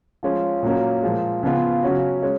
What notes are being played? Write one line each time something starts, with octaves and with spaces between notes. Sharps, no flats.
F3 G#3 C#4 F4
A#2 F#3 A#3 C#4
A#2 F3 G#3
C#3 F3 B3 F4
C#3 F#3 C#4 F#4
G#3 C#4